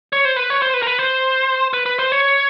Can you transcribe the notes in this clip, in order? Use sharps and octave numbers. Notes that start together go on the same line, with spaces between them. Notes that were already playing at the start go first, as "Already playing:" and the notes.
C#5
C5
B4
C#5
C5
B4
A#4
B4
C5
B4
B4
C5
C#5